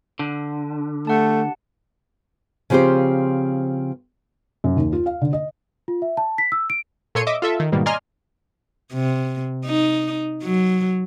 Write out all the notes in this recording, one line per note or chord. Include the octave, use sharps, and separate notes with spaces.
D3 D4
A3 G4 F#5 A5
C#3 F3 C4 F4 G4 C5
F#2
D#2
F4
F5
D3
D#5
F4
E5
A5
B6
E6
D7
A#2 A4 C#5 C6 C#7 D#7
D#5 E5 D6
F4 A4 E5
D#3
G#2 B2 D#3 G3 A#3
D5 D#5 G#5 A#5 C6 F6
C3
D#4
F#3